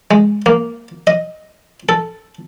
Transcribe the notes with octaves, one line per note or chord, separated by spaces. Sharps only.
G#3
A#3
D#5
A4